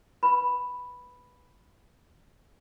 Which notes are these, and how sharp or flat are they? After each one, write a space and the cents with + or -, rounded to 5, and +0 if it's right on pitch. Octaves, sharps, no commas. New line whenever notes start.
B4 +0 B5 +0